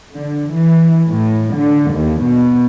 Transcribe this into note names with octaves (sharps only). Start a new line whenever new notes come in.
D3
E3
A2
D3
D#2
B2